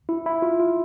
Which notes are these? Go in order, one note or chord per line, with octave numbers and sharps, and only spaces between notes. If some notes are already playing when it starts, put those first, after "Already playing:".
E4
E4
F4
F4